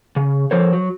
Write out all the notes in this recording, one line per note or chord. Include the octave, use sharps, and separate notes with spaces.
C#3
F3 A4 A#4 C5 C#5
F#3